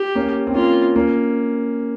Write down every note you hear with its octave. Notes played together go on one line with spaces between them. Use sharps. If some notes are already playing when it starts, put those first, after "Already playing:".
Already playing: G4
A#3 C#4
C4
A#3 C#4 F4
A#3 C#4